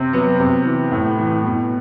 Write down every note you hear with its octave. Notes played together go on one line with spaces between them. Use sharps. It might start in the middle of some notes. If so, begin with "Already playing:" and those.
Already playing: C3 C4
F#3 B3
C3
E3
A2
E3
B2